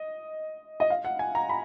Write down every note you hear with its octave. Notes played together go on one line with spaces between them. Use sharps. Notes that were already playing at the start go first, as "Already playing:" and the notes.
Already playing: D#5
D#5
F5
F#5
G#5
A#5
B5